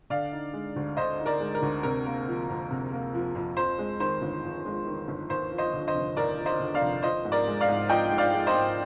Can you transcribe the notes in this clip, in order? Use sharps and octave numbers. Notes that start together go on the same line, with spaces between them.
D3 D5 F5
D#4
G#3
D2
D3 C5 D#5
D#4
A#4 D5
G#3
A#4
D2
C3 A#4
A#3
F3
F2
C3
A#3
F3
F2
F2 C5
G#3
D#3 C5
G1
F2
G#3
D#3
G1
D#2 C5
F3
C5 D#5
D3
C5 D#5
F1
D#2 A#4 D5
F3
C5 D#5
D3
D5 F5
F1
F3 C5 D#5
G#2
A#4 D5
G#3
D5 F5
G#2
F3 D#5 G5
G#2
D5 F5
G#3
C5 D#5
G#2